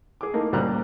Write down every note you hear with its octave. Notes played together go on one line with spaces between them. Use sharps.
G#4 D6
A3 A#3 D#4
C#2 A#2 G3 C5 A#5 F#6